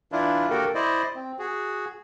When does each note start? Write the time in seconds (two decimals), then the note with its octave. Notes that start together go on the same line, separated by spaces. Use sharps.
0.12 E3 D4 E4 F4
0.50 D3 A#3 F#4 G4 A4 A#4
0.75 E4 C5 D5 D#5
1.16 C4
1.39 F#4 G#4